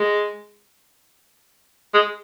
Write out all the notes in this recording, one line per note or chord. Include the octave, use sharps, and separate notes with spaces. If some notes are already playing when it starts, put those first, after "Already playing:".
Already playing: G#3
G#3